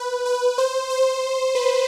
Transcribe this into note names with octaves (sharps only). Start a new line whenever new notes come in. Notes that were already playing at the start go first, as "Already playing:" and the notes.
Already playing: B4
B4
C5
C5
B4